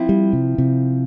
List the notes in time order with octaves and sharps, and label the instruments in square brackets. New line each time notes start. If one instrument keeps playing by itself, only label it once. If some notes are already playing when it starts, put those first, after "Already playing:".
Already playing: [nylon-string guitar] F3 C4 E4
[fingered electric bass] G3
C3
C3